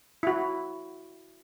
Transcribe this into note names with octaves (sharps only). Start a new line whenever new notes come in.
E4 F#4